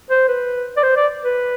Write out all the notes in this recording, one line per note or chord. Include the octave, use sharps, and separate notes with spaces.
C5
B4
D5
C5
D5
B4